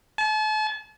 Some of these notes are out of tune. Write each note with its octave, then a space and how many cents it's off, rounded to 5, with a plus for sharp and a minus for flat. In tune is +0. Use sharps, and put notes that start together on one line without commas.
A5 -40